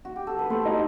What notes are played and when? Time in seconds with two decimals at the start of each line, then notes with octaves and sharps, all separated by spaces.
0.05 F#4
0.16 G4
0.27 A4
0.39 B4
0.50 A3 C5
0.66 D#4 F#4